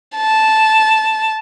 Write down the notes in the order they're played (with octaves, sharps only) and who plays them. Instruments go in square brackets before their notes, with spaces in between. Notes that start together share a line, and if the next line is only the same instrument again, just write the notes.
[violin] A5